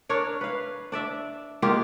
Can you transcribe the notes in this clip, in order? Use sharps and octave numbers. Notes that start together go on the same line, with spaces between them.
D4 A#4 C#5
B4 F5
D4 D5 E5
G#3 A#3 F4 G4